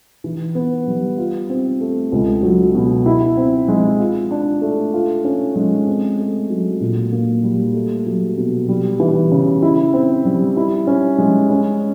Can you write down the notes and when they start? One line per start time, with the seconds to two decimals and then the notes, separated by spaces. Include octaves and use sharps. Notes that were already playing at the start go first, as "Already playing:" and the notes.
0.24 E3
0.55 B3
0.87 G3
1.18 F4
1.50 C4
1.81 A3
2.12 C#2
2.43 F#3
2.75 B2
3.06 E4
3.37 C4
3.68 G#3
3.99 F4
4.31 D4
4.62 A3
4.93 F4
5.25 C#4
5.56 G#3
5.87 C4
6.19 A3
6.50 F#3
6.80 A#2
7.12 A#3
7.43 G3
7.74 A3
8.06 F#3
8.37 B2
8.68 G3
9.00 E3
9.31 C#3
9.62 E4
9.93 C4
10.25 G3
10.57 E4
10.87 C#4
11.19 G#3
11.50 C#4